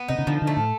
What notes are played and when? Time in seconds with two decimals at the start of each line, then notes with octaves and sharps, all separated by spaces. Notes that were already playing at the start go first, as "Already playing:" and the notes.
Already playing: B3
0.08 C3 D#4
0.19 C#3
0.27 D3 F3
0.42 D3
0.47 A3
0.57 A2